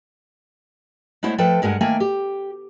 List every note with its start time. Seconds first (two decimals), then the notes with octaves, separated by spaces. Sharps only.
1.23 G#3 A3 B3 E4 C5 C#5
1.38 F3 A3 A4 B4 G5 A5
1.62 G2 G#3 A#4 F#5 G#5
1.81 D#3 A3 A#3 G5 G#5
2.00 G4